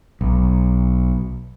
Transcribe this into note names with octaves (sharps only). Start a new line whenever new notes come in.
B1